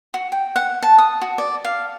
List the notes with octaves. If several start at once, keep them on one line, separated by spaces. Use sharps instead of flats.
F#4
G5
F#5
A5
D#6
F#4
D5
F5